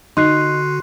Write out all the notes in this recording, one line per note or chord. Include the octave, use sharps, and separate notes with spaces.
D3 D#4 F#4 C6 F#6 C7